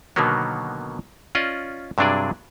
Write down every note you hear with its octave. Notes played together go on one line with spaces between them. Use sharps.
B2 D3 D#3 F#3 A#3 B3
C#4 F4 D5 D#5
G2 C3 F#3 D4 G#4 D5